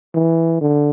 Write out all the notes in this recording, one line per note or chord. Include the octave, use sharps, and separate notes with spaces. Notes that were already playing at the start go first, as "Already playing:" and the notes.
E3
D3